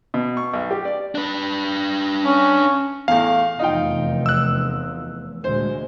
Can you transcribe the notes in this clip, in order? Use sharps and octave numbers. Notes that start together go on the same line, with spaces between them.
B2
C#6
B1
G4
D5
D4 B4
C#4
E2 A2 F5
F1 E2 D#4 F4 G5
E6 F#6
D2 A#2 G#3 C5